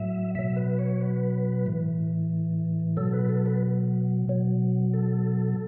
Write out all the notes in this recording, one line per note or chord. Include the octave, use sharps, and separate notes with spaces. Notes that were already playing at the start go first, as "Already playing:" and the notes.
Already playing: A2 F#3 E5
B2 F#3 E5
B4
C#5
B4
A2 E3
B2 F#3 A4
B4
A4
B4
B2 F#3
A4